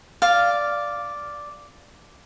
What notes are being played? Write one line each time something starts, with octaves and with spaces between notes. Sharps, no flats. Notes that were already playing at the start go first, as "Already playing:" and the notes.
D5 F5